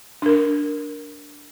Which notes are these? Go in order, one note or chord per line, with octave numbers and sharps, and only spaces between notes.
D4 A#4